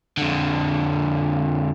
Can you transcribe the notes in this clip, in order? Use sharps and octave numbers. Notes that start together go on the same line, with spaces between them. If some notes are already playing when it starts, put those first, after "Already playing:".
F2 D3